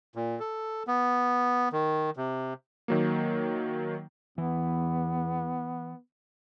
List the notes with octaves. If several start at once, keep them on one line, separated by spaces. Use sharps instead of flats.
A#2
A4
B3
D#3
C3
D#3 F#3 A#3
E2 E3 B3